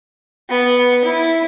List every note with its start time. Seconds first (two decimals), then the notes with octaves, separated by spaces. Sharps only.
0.50 B3
1.05 E4